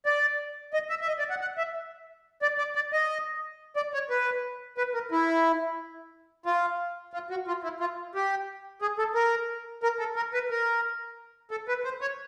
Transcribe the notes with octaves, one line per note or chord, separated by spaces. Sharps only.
D5
D#5
E5
E5
D#5
D5
F#5
F#5
E5
D5
D5
D5
D#5
D5
C#5
B4
B4
A#4
E4
F4
F4
F#4
F4
E4
F4
G4
G#4
A4
A#4
A#4
A4
A#4
B4
A#4
A4
B4
C5
C#5